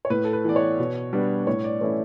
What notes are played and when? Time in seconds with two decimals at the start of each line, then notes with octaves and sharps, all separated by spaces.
0.05 C#5
0.10 A2 B4
0.24 A4
0.33 B4
0.44 E3 B3 D5
0.56 C#5
0.79 B2
1.13 G3 B3 D4
1.47 A2 C#5
1.64 D5
1.81 E3 A3 C#4 E4 C#5